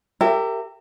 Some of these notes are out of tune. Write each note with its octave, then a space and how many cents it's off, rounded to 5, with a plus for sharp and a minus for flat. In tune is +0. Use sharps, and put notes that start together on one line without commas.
G4 +0 A#4 -25 E5 +15